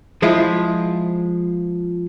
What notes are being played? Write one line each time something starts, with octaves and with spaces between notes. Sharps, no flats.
F3 G#3 E4 F4